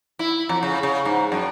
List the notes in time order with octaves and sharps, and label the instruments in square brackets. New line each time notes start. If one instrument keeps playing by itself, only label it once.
[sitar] E4
F2
C#3
C#3
G#2
F#2